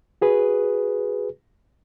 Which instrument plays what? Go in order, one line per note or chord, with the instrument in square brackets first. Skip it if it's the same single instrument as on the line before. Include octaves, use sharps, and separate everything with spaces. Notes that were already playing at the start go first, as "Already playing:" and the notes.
[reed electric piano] F#4 G#4 B4